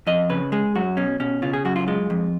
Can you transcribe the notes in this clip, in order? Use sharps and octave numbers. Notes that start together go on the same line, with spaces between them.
F2 D#5
C#3 B4
G#3 G#4
F#2 F#4
B2 C#4
B2 C#4
C#3 F4
G#4
F#2 F#4
F4
G#3 F4
F2